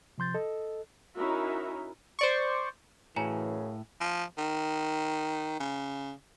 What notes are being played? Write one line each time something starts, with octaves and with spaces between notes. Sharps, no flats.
C3 F3 C6 G6 A6
A4 D#5
C#4 D#4 E4 F#4 A#4 E5
C5 D5 C#6
F#2 A2 C#3 E3 G#5 A#5
F3
D#3
C#3